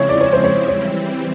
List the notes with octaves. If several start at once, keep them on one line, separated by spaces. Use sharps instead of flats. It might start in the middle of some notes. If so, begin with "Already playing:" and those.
Already playing: C#3 F3 G#3 C4 E4 C#5
D5
C#5
C5
C#5
E3 G3 C4 C#5